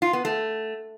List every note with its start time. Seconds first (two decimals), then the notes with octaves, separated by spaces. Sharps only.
0.02 F4
0.13 B3
0.25 A3